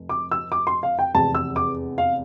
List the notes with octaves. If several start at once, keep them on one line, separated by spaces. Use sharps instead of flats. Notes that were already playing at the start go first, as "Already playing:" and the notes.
Already playing: F1
D6
E6
D6
C6
F5
G5
F1 E2 C3 A5
E6
D6
F5